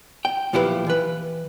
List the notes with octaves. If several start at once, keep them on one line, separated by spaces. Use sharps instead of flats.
G5
B1 A#2 F3 E4 G4 B4
E3 B4